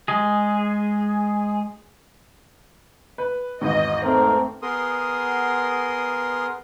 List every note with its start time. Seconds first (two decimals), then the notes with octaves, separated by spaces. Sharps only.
0.08 G#3 G#4
3.18 B4
3.61 G#1 E2 G#2 D#5
4.04 A3 C4 A#4
4.62 B3 G#4 A#4 C6 D#6